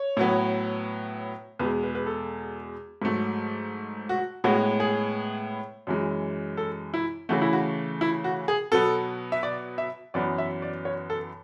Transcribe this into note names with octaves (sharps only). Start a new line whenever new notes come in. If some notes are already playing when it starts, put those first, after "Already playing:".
Already playing: C#5
A2 F#3 B3
E2 B2 G#3 B4
B4
B4
A4
G#2 F#3 A3
F#4
A2 G#3 B3 F#4
G#4
F#2 E3 G#3
A4
E4
C#3 E3 A3 F#4
E4
F#4
E4
F#4
G#4
B2 F#3 B3 A4
E5
D5
E5
F#2 E3 B3 D5
E5
D5
C#5
A4